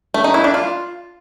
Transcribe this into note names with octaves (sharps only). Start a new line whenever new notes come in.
A3
D#4
E4
D4
F4